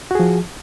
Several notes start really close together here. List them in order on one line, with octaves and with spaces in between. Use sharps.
F#4 G#4 F3